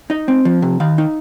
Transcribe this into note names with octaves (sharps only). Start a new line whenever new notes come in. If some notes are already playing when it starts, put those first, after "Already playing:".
D#4 D#5
C4
F3
C3
D#3 F5
D#4